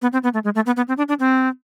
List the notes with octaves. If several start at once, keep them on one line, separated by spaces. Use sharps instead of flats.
B3
C4
B3
A3
G#3
A3
B3
B3
C4
D4
D4
C4